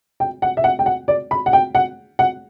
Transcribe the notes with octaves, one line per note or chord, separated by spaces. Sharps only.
G5
F#5
E5
F#5
G5
F#5
D5
B5
F#5
G5
F#5
F#5